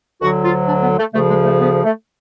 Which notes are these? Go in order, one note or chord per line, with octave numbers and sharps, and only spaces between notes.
D2 D3 F#3 F#4
F4
D4
B3
A3
D2 C#3 F3 A3
G#3
A3
B3
A3